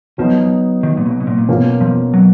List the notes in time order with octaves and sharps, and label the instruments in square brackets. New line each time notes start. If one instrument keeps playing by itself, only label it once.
[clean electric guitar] F2 F3 [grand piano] F#3 B3 D#4
[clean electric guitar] D#2 D#3
A#2
B1 B2
B2
A#2
A#2
[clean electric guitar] G#2 [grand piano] B2 A#3 C#4 F4
[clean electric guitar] F2 F3
F#3